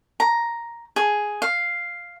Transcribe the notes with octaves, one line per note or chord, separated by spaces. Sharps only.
A#5
G#4
F5